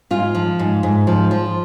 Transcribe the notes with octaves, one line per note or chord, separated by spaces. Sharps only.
G#2 F4
F3
G#2
G#2
F3
F3